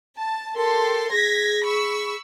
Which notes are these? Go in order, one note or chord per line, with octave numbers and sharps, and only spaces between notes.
A5
G4 A4 A#4 C6
G#4 G#6 A#6 B6
B5 C#6 E6